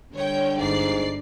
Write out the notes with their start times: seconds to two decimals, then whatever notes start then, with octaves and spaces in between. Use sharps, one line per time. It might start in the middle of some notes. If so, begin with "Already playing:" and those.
0.15 D3 G3 C#5 G5
0.58 G1 G#2 D5 C7